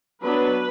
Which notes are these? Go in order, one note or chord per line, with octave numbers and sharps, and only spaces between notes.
F#3 B3 D4 B4